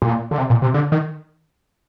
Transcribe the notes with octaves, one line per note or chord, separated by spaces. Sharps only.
A#2
D3
C3
A#2
C3
D3
D#3